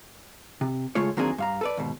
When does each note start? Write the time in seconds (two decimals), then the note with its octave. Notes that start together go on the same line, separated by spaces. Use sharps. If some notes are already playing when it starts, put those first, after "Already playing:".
0.61 C3
0.95 C#3 G#3 A3 F4 C#5
1.17 D#3 F#3 A#3 C4 D4 G#4
1.38 G2 F5 A#5
1.61 A4 B4 D5
1.77 D#2 G#2 B2